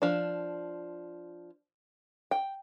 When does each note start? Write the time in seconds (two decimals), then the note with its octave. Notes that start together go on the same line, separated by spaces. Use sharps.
0.02 F3 D4
2.31 G5